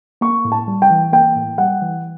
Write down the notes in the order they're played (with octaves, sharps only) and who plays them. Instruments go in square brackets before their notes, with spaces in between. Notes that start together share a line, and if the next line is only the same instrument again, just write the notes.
[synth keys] A#3 [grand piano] C#6
[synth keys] A2
[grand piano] A5
[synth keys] G3
[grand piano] G5
[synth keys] E3
[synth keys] A#3 [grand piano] G5
[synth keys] A2
[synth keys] G3 [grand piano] F#5
[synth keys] E3